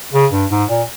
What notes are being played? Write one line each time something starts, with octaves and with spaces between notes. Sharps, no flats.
C#3
G2
G#2
A#2